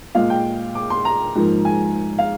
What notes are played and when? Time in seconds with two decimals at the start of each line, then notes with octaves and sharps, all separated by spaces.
0.15 A#2 G#3 F5
0.30 G5
0.75 D6
0.90 C6
1.05 A#5
1.35 G#2 F3 A#3
1.65 G#5
2.19 F5